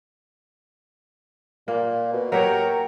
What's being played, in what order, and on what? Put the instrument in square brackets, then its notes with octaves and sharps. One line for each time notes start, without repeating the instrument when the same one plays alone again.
[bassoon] A#2 [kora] A#3
[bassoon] B2
[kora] F#3 G4 C#5 [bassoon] A#4